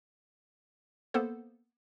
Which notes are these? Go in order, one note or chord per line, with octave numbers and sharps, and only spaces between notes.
A#3 B3 A4 C5